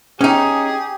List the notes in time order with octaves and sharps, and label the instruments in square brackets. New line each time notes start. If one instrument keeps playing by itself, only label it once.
[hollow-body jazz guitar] C#4 D#4 [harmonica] G4 [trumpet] G#4